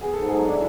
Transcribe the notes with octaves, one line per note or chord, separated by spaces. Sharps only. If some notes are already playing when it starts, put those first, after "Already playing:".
B3 G#4
G#2 A4
F#3 G#4
D4
E4